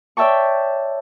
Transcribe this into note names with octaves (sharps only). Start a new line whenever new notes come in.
C#5 D5 E5 G5 A5 C#6